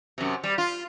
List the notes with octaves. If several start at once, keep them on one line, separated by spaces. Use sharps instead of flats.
F#2 C3
G3
F4